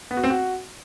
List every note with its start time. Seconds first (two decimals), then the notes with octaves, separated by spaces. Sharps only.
0.11 B3
0.17 F#4
0.24 C4
0.30 F#4